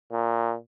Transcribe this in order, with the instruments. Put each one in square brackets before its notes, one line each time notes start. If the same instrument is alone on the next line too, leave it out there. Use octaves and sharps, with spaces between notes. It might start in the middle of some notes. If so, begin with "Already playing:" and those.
[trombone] A#2